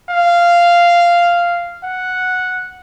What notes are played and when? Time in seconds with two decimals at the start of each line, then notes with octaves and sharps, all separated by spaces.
0.11 F5
1.85 F#5